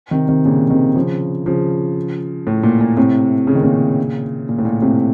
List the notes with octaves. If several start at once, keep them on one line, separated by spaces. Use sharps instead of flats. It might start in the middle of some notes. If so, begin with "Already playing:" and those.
C3 D#3
C3 D#3
A#2 C#3
C3 D#3
C#3 F3
C#3 F3
A2
A#2
A#2
A2 C3
C#3
D#3
A#2 C#3
A#2
A2
A#2
A2 C3